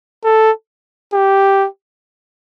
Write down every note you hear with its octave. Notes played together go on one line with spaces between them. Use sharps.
A4
G4